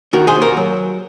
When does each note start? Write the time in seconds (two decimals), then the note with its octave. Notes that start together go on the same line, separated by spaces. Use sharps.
0.13 D#3 F#4 A#4
0.27 G#4 C5
0.35 D#2
0.42 F#4 A#4
0.57 F#3